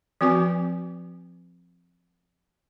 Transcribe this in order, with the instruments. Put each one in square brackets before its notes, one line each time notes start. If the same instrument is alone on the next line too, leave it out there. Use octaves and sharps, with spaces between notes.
[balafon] F3 C4 F#4 B4 G#5